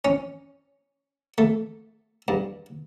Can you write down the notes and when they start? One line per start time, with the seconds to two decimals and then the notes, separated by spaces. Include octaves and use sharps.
0.05 C#4
1.38 A3
2.28 G2